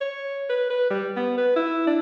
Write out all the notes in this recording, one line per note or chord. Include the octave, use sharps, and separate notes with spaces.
C#5
B4
B4
G3
B3
B4
E4
D4